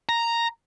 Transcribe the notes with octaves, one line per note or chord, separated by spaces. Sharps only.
A#5